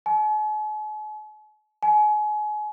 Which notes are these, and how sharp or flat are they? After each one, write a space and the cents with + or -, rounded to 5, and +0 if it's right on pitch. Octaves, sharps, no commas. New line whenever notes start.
G#5 +45
G#5 +30